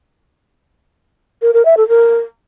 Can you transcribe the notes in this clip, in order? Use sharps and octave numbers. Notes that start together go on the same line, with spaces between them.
A#4
A#4
E5
A4
A#4